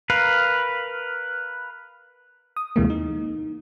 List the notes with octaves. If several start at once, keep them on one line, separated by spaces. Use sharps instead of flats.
A#4 B4 F5
D#6
D#2 C3 E3 G#3 A#3
D#4